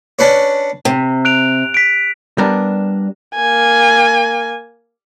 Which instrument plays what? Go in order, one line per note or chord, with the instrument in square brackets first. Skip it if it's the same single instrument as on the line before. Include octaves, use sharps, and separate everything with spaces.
[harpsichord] C#4 D4 B4 C#5
[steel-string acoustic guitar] C3
[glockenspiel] F#6 D7 F7
B6 D7
[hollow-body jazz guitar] G3 B3 D4 A#4
[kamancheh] A#3 G#5